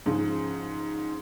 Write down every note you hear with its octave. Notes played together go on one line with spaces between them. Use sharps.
G#2 C#3 F3 G#3